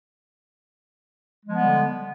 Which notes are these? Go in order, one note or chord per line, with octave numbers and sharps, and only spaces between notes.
D3 F3 G3 G#3 B3